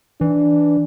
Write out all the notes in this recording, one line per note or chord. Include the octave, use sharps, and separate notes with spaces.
E3 D4